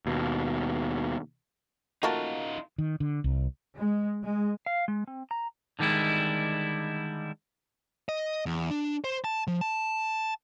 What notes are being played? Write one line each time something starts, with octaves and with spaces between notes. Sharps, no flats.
D#2 B2
F3 A3 A#3 D#4 F4 F#4 A#4 A5
D#3
D3
C2
G#3
G#3
F5
G#3
C4
A#5
D3 D#3 G3 G#3 E4
D#5
E2
D4
C5
A5
F3
A5